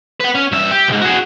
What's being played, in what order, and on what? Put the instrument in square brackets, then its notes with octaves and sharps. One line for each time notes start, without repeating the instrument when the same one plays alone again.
[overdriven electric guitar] B4 F#5
C#4
G2 E5
G4
C2 G#2
F#4 G#4